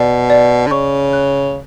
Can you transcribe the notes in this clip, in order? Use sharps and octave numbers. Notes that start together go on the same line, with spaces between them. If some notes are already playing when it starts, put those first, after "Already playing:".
Already playing: B2 D5
D5
D3
C#3 C#6
F#6